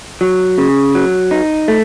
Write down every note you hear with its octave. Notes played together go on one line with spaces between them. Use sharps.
F#3
C#3
F#3
D#4
A3